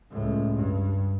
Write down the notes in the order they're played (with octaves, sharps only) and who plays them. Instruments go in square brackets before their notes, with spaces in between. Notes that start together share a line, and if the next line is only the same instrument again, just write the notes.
[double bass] C#2 A2
G2